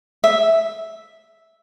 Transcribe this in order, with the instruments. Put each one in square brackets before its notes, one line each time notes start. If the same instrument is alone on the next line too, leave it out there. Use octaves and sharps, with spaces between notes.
[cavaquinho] E5